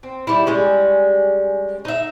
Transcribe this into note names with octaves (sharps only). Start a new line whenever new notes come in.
C4
G3 E4
G3 G#3 C#4
D#4 E5